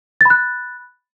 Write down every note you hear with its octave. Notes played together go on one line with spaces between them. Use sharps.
B5 F#6 A6